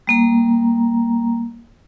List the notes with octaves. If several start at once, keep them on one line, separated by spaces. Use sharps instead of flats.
G3 A#3 A#5